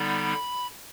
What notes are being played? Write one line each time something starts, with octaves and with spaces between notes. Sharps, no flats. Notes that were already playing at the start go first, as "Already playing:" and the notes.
Already playing: D3 G3 B3 D#4 B5